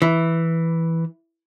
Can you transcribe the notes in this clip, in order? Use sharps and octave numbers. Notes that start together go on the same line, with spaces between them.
E3